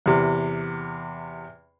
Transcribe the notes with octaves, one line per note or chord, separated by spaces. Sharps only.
E2 C3